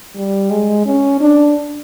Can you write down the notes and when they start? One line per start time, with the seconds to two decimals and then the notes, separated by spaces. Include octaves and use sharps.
0.16 G3
0.51 G#3
0.86 C#4
1.21 D4